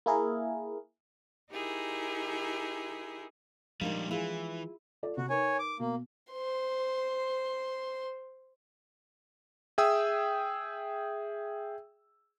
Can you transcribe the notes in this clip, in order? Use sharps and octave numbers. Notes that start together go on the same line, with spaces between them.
A#3 E4 G#4 A#4
D#4 E4 G4 G#4 A#4
A#2 F3 G3 G#3 A#3 D4 D#4
E3 E4 F4 G#4
F4 A4 D5
C3 F#4
D#4 A#4 B4 C#5 G#5
D6
B2 A#3
C5 C6
G#4 E5 G5 D#6 E6